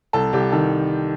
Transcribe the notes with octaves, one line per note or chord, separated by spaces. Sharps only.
C2 A4
C2 G4
D#3 A4